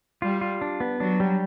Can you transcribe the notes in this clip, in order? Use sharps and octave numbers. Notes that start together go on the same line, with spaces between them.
G3 F4
F4
D4
B3
F#3 D4
G3